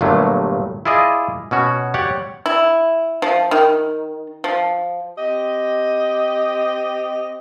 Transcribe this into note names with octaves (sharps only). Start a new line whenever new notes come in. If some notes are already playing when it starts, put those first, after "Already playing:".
G1 G2 A#2 F#3 A3
E4 F4 G#4 D5 D#5
B2 C#4 F#4
G4 C#5 D5 F#5
E4
F3
D#3
F3
C4 G4 D#5